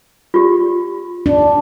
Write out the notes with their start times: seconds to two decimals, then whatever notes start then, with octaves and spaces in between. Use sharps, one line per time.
0.34 F4 G4
1.26 D4